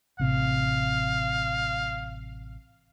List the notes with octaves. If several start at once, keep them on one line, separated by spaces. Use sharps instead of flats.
A1 C3 F5